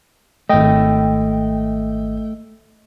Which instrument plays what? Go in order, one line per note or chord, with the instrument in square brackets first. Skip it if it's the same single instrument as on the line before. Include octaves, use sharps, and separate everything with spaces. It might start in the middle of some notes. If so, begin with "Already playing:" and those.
[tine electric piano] G#1 D#5 [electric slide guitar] A3 G5